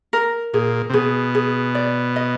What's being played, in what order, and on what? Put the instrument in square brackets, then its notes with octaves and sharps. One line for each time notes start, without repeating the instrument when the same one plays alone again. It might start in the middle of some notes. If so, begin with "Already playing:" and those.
[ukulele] A#4
[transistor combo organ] A#2 [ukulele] G#4
[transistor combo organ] C3
[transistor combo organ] B2 [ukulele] G#4
[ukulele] G#4
D5
D#5